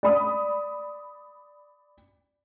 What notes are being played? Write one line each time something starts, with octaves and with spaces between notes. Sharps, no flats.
D5 B5 D#6